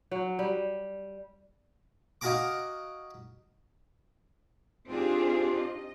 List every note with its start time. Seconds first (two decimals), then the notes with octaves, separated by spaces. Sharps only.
0.11 F#3
0.39 G3
2.21 D#4 F#4 F5 G#5 A#5 D6
4.88 C4 D4 D#4 F4 G4 G#4
5.57 D#5